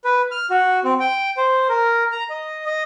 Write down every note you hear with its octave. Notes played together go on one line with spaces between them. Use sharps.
B4
F6
F#4
C4
G5
C5
A#4
A#5
D#5
D#5